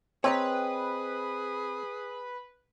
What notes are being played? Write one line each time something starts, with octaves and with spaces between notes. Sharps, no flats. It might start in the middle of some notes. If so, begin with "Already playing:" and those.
C4 G#4 B4 C#5 D#5 A#5